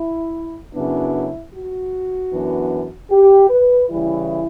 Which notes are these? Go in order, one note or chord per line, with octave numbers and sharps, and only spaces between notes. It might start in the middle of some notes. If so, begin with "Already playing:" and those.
Already playing: E4
F#2 C#3 F#3 B3 D4 E4
F#4
F#2 E3 B3 D4
G4
B4
C#3 E3 G3 E4